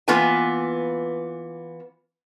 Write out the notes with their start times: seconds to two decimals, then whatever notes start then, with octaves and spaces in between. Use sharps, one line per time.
0.08 E3 A#3 B3 F4 B4 G#5